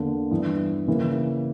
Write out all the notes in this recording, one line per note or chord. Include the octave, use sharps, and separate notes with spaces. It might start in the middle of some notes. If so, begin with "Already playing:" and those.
Already playing: E2 D3 A#3
G2 E3 B3
C#3 E3 A#3